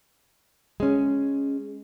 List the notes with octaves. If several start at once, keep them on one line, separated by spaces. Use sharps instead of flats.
G#3 C#4